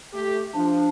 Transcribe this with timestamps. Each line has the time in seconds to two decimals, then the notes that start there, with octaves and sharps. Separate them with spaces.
0.14 A3 G4
0.54 F3 D4